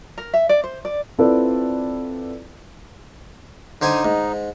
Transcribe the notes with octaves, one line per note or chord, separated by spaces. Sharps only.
A#4
E5
D5
C5
D5
C4 E4 F4 A4 B4 D5
D3 D#4 C5 G#5
G#2